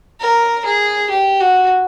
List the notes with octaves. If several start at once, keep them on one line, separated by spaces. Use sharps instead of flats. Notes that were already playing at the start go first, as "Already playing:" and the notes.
A#4
G#4
G4
F#4